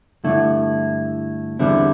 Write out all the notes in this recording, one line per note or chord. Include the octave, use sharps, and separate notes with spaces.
G2 D3 A3 E4
E2 D3 G3 C4 E4